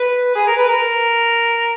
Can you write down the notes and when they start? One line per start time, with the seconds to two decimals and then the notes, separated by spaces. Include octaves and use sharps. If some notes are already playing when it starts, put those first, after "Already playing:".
Already playing: B4
0.35 G#4
0.47 A#4
0.57 B4
0.68 A#4